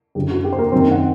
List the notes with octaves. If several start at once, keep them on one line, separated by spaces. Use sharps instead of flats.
F#2 D3 G4
F#4
G4
C5
A#3 A#4
F#2 D#3 C4 C5
F#5